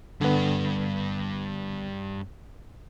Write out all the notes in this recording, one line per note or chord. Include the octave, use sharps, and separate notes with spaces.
G2 D3 B3